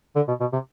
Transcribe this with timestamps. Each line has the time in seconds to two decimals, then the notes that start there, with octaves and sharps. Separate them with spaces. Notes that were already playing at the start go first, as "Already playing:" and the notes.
0.16 D3
0.28 B2
0.41 B2
0.53 C3